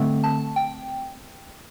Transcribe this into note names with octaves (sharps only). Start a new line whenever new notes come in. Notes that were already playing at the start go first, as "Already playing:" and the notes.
Already playing: D3 A3 C4
A5
G5